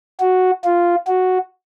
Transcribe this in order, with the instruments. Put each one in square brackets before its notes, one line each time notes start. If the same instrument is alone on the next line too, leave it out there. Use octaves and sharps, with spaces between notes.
[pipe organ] F#4
F4
F#4